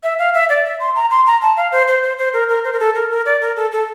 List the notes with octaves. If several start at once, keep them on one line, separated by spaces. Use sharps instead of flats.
E5
F5
E5
D5
E5
C6
A#5
C6
A#5
A5
F5
C5
C5
C5
C5
A#4
A#4
C5
A#4
A4
A#4
A#4
D5
A#4
A4
A4